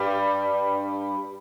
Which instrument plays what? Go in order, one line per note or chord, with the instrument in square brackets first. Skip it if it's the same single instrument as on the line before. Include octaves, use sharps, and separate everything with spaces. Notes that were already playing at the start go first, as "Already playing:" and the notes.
Already playing: [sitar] G2 G3